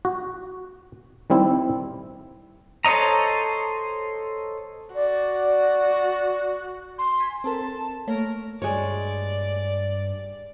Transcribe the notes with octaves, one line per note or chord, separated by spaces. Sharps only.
F#4
D#3 G3 C4 E4
A4 C5 C#5 D#5 A#5
F#4 D5
C6
G#5 B6
C4 A4 A#4 A5
A3 A#3 A#4 C#5
G2 G#3 C#5 D5